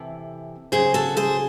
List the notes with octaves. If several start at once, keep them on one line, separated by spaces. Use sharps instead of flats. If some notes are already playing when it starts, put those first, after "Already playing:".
Already playing: C3 E3 A4
C#3 F#3 G#4 C5
F#4 A4
G#4 C5